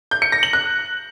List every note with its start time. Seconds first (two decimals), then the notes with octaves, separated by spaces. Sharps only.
0.11 G6
0.22 C#7
0.32 A#6
0.43 F#7
0.53 F#6